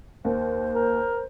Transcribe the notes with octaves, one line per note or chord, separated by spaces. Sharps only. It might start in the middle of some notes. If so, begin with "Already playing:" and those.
D#2 C5
A#4